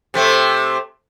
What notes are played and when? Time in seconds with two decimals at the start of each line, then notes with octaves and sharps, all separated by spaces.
0.14 C3 A3 C4